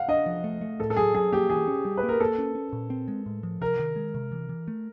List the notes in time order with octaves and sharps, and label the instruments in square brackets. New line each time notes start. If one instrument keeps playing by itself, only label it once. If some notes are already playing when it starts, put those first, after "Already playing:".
Already playing: [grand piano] F5 F#5
[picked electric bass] D4 [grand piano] D#5
[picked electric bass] F3
A3
A3
[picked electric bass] A2 [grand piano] A4
[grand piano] A4
[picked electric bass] F#3 [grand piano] G#4
[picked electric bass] F#3 [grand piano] G#4
[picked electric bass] A#3 [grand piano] G4
[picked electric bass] E3 [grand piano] G#4
[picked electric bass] C#4
G3
[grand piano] B4
[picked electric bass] A#3
[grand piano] A#4
[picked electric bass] A#3 [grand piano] A4
[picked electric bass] C#4
C#4
A#2
C4
G#3
A2
F3
[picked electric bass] C3 [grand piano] A#4
[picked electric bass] D#3
G#3
C3
E3
E3
A3